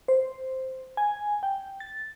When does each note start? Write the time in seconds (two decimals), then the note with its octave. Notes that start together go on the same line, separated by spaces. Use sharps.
0.08 C5
0.97 G#5
1.43 G5
1.80 A6